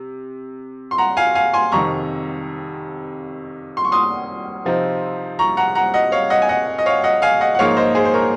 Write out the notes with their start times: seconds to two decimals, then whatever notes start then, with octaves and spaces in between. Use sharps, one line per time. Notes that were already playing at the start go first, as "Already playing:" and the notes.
Already playing: C3
0.91 C6
0.98 F#5 A#5
1.17 F5 G#5
1.35 F5 G#5
1.53 G#5 C6
1.72 F2 C3 D#3 A#5 C#6
3.77 C6
3.85 C#6
3.92 C6 D#6
4.65 C3 F3 C4 D#4
5.39 A#5 C#6
5.57 F#5 A#5
5.75 F#5 A#5
5.94 D#5 F#5
6.12 C#5 F5
6.30 D#5 F#5
6.42 G#5
6.49 D#5 F#5
6.78 D#5
6.86 C#5 F5
7.04 D#5 F#5
7.22 F5 G#5
7.41 D#5 F#5
7.55 F#5
7.59 G#2 F3 A#3 D#4 C#5 F5
7.77 C5 D#5
7.95 G#4 C5
8.05 C5
8.14 A#4 C#5